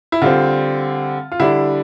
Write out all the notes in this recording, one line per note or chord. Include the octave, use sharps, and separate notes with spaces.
E4
D3 G3 C4 F4
F4
D3 G3 D4 E4